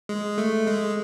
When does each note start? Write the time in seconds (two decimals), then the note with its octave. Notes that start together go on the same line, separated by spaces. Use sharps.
0.09 G#3
0.38 A3
0.67 G#3